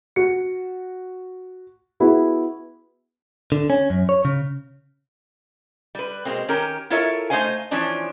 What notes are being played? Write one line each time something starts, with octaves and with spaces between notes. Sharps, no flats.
F#4 C#7
B3 E4 F#4 G#4
D3
C#4
F#2
C#5
C#3
G3 B4
B2 G#3 A#3 C4
D#3 C#4 G4 A#4
E4 F4 A4 A#4 C#5 E5
A3 B3 D#4 C5 F5 G#5
E3 F3 C#4 D4 C#5